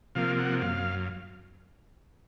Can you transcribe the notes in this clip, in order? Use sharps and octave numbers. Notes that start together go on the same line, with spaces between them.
C3 F3 A#3 F5
F#5
F#2 F5